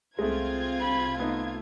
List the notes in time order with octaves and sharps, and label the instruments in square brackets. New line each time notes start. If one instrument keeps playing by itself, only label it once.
[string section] C2 F4 G#6 [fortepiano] G#3 A3 [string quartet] C4
[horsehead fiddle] B5
[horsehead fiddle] A3 [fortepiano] B3 D#4